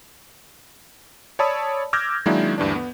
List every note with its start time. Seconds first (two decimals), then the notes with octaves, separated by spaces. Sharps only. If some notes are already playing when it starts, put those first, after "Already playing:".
1.39 C#5 D5 A5 B5 D#6 E6
1.93 D6 E6 F6 G6 G#6 A#6
2.26 D#3 F#3 G#3 A#3 D4 E4
2.58 D2 G2 E3 D4
2.75 B3